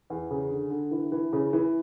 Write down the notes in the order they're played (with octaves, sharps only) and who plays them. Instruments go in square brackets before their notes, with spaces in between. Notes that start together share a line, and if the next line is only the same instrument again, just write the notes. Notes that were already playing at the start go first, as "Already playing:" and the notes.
[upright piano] E2
C#3
D3
D3
E3
E3
C#3
E3